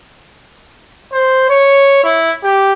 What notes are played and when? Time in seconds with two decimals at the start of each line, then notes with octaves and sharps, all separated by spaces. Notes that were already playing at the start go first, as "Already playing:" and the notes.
1.13 C5
1.49 C#5
2.04 E4
2.43 G4